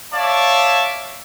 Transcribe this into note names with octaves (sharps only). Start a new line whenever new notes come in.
C#5 D5 E5 F5 A5